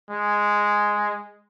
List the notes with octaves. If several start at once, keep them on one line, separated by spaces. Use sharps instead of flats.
G#3